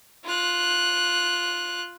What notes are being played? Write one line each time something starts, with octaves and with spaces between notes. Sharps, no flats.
F4 F#6